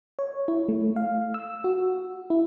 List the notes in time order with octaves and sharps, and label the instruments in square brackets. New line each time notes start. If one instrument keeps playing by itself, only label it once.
[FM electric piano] C#5
E4
A3
F5
E6
F#4
E4